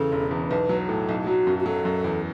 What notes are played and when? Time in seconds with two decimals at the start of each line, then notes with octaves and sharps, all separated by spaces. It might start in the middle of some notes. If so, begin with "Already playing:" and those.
Already playing: E2 C#3 A4
0.12 E1
0.31 E2
0.50 B1 B4
0.69 F#3
0.88 A2 A4
1.09 B1
1.24 A4
1.27 F#3 F#4
1.47 F#2
1.60 F#4
1.66 F#3 A4
1.85 F#2
2.04 E2